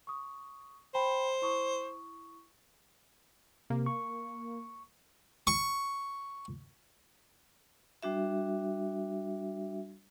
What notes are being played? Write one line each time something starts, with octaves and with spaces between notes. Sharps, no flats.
C#6 D#6
C5 G5 A5 B5
E4 C#6 D#6
C3 A#3
C#6
C#6
G3 D4 F#4 E5